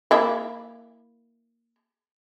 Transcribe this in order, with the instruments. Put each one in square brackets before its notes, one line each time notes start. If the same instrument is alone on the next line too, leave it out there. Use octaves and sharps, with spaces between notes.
[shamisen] A#3 E4